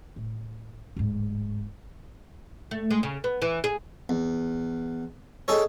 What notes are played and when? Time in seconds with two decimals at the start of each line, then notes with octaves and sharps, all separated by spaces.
0.16 A2
0.96 D1 G#2
2.71 A3
2.91 G#3
3.03 C#3
3.24 B3
3.42 E3
3.64 G#4
4.09 E2
5.48 D#4 G#4 A4 C#5